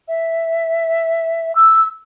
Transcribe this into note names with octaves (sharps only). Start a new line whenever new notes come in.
E5
E6